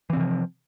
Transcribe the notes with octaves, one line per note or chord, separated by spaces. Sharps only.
C3 E3 F3 C4